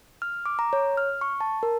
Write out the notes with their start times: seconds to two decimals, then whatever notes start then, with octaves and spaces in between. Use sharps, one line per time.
0.22 F6
0.46 D6
0.59 A#5
0.73 C#5
0.97 F6
1.21 C#6
1.41 A5
1.63 A#4